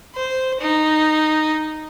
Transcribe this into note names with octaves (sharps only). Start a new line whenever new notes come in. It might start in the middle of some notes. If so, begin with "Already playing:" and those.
C5
D#4